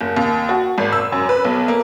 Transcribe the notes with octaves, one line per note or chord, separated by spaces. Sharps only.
F#1
D#2
F#4
G#1
E6
F#2
B4
B1
A#3